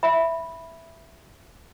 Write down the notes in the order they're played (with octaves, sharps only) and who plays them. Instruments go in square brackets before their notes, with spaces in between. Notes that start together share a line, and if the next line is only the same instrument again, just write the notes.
[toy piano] E5 B5